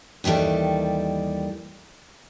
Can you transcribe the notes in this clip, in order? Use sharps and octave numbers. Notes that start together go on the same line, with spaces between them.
D#2 D#3 E3 G3 A4